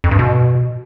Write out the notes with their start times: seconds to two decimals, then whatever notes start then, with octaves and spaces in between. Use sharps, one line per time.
0.04 F2
0.11 G2
0.19 B2